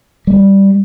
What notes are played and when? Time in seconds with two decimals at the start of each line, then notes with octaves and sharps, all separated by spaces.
0.27 G3